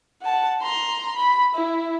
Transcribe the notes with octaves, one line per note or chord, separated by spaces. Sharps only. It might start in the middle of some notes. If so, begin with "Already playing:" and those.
F#5 A5
A#5 C6
B5
E4